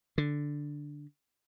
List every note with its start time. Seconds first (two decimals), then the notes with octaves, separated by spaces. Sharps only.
0.18 D3